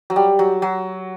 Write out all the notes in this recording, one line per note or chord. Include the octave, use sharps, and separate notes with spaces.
F#3
G3
F#3
F#3